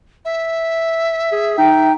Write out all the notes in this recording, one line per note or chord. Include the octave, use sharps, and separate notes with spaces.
E5
G#4
D#4 G5